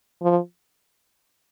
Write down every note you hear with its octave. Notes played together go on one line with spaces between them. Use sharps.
F3